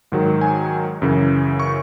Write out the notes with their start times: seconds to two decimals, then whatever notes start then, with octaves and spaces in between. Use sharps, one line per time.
0.12 G#2 D#3 F#3
0.41 G#5
1.02 F#2 C#3 E3
1.60 C#6